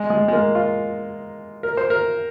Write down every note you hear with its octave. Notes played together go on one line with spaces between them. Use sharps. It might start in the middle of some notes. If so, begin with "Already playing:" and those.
Already playing: G#3
G#3
G#3
A#3
F4
A#4
C5
A#4